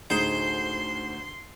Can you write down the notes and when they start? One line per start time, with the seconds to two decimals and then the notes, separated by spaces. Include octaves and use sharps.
0.10 D2 A2 D#4 G#4 C5 C6